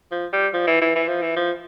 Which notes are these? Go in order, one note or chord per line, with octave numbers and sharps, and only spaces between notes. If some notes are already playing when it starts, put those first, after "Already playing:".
F3
G3
F3
E3
E3
E3
F3
E3
F3